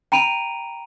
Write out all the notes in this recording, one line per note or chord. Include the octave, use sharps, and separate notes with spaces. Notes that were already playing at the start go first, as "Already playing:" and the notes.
G5 A#5 B5 D7 D#7 F7